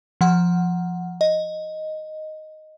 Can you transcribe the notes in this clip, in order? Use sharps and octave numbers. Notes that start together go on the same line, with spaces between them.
F3 F#5
D#5